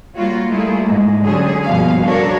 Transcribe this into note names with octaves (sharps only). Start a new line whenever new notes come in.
G3 A#3 F4 F#4 C#5
G3 A3 A#3 E4 F4 G#4
G#2 G#3
D3 F#3 C#4 G4 G#4
G2 B2 F3 A#3 B3 F5
C#3 D4 F#4 A4 A#4 C#5